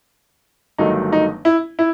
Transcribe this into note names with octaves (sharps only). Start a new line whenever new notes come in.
G1 G2 D#3 F#3 A3 D#4
D#4
E4
E4